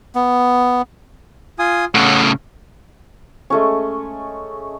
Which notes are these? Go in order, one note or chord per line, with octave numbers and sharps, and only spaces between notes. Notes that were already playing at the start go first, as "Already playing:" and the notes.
B3
F4 G#5 D#6
A2 C#3 C#5 F#5 D#6
G#3 A3 C#4